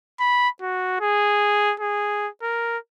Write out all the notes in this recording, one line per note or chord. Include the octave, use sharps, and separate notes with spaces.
B5
F#4
G#4
G#4
A#4